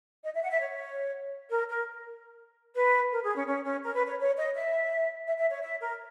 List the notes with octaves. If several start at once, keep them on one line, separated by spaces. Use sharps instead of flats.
D#5
E5
F#5
E5
C#5
A#4
A#4
B4
A#4
G#4
C#4
C#4
C#4
A#4
B4
C#5
C#5
D#5
E5
E5
E5
C#5
E5
A#4